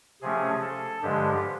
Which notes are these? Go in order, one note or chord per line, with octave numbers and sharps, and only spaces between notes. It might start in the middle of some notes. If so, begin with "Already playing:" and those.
C3 F3 A3 C#4 G#4
A4
G2 D3 F3 G#3 G4